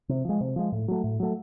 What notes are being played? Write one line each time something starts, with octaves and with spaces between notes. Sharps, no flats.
C3
F3 G#3
C3
F3 G#3
A2
F#3 A3
A2
F#3 A3